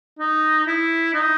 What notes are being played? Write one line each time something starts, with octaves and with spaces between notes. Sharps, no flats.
D#4
E4
D#4